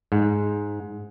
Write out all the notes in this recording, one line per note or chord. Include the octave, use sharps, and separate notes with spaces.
G#2